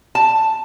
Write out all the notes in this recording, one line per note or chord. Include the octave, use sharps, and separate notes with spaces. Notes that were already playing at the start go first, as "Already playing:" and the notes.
A5